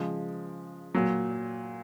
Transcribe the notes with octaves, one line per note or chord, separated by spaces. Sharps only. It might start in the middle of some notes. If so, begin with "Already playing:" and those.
Already playing: C#3 F3 G#3
A#2 F#3